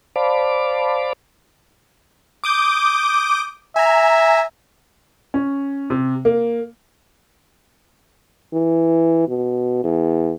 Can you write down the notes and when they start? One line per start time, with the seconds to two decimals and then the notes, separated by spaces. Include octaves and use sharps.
0.16 C5 D5 F5 A5 B5 D6
2.44 D6 D#6 G6
3.76 E5 G#5 A#5
5.34 C#4
5.90 C3
6.25 A#3
8.53 E3
9.28 B2
9.84 E2